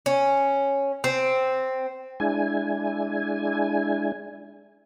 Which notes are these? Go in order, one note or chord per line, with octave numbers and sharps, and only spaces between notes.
C#4
C4
G#3 D4 E4 G#5